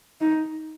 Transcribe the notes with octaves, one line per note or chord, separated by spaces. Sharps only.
D#4